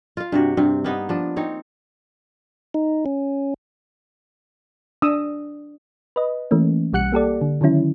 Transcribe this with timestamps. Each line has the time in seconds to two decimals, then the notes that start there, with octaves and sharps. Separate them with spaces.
0.17 F4 F5
0.32 G2 C3 F#4 G4
0.57 G2 C3 C4
0.84 A#3 B3 D#4
1.09 F3 D4
1.36 C4 D#4 C#5
2.74 D#4
3.06 C#4
5.02 D4 D#6 E6
6.16 B4 D#5
6.51 E3 A3 A#3 C#4
6.93 B1 G3 F#5 F#6 C#7
7.12 A#3 G4 A4 D5
7.41 D3
7.61 D3 D#3 F#3 C#4 E4